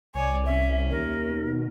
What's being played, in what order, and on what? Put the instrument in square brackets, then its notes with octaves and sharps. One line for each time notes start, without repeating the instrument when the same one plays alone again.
[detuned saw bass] C2 [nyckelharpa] C#5 D5 [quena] G#5
[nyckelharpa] C#4 [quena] E5
[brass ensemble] D#2 [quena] A#4
[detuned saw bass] B2